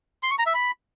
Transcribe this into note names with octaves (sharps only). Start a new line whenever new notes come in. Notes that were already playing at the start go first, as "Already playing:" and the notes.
C6
C#6
A#5
E5
B5